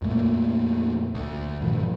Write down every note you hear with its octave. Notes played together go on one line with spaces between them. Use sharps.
F2 A#2 A3 A#3
D2
G2 A#2 D#3 F3